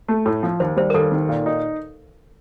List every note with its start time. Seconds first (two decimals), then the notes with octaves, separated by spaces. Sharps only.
0.08 A3
0.26 A2
0.43 F3
0.60 D#2 C5
0.77 G3 C5
0.90 A#4
0.94 D#2 A4
1.12 D#3
1.29 A#2
1.46 D#4